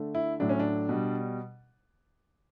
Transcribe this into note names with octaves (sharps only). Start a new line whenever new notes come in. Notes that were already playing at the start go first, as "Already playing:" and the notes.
Already playing: D3 A3
E4
A2 F#3 A3 D4
C#4
D4
B2 G3